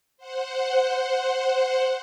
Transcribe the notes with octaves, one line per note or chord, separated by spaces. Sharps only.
C5 F#5